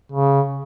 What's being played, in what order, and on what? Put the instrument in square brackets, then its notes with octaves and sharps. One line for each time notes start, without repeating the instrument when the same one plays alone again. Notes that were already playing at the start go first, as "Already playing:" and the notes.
[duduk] C#3